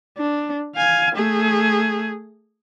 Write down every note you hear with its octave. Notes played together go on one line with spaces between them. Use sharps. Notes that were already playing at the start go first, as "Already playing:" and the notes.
D4
F5 G#5
A3 G#4